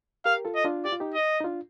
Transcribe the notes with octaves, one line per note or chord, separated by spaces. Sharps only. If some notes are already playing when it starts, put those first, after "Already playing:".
G4 A#4 F5
F4 A4
D#5
D4 F4
G4 D5
F4
D#4 G4
D#5
D#4
D4 F4